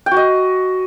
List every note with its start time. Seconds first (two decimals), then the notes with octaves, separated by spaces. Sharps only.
0.06 G5
0.11 F#4
0.17 D#5